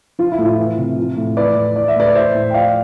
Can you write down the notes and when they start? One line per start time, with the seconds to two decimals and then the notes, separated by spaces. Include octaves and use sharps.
0.19 F3 F4
0.32 E4
0.39 A2
0.45 F4
0.58 E3
0.78 C3
0.97 F3
1.17 A2
1.37 E3 B4 D5
1.56 A2
1.76 E3 D5
1.88 E5
1.96 A2 B4 D5
2.15 E3 C5 E5
2.35 A2
2.50 G5
2.54 F3 D5 F5